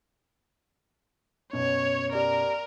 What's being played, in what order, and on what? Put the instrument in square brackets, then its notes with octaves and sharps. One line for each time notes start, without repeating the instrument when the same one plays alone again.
[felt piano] F#2 B2 [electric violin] C#5
[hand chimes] G4 D5 [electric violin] A#4